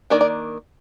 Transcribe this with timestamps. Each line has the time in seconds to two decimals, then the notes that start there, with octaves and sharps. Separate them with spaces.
0.10 D#3 A#3 D4 A#4 D5
0.21 A#4 D5